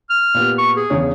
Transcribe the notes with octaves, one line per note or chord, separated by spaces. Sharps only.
F6
A#2 B3 G4
C#6
G#4
E2 C#3 C#5